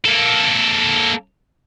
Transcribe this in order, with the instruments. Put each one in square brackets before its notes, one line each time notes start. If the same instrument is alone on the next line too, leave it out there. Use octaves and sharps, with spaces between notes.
[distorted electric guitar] A#3 A4